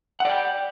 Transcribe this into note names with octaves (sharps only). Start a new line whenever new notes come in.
D5 F#5 G5